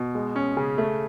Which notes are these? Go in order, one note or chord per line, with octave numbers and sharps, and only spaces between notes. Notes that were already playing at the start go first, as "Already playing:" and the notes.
Already playing: B2
G#3
C#4
C#3
A3